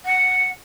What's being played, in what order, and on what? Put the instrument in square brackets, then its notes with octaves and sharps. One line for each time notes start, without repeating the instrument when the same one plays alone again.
[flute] F#5